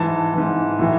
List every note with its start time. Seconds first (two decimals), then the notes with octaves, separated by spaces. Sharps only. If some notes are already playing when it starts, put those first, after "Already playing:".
Already playing: G#2 E3 A5
0.34 G#2 E3
0.79 A2 E3